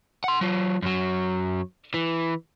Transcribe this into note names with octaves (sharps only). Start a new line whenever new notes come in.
F#5 C6
F#3 F4
F#2 F#3
E3